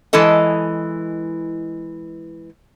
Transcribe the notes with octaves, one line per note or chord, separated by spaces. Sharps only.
E3 G#3 E4 A4 D#5